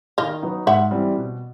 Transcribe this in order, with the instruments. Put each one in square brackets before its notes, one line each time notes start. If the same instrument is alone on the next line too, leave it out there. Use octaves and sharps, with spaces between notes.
[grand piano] D#3 [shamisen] D#5 F5
[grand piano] F#3 B3 D#4
[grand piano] G#2 [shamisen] E5 F#5
[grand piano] E3 G3 C4
B2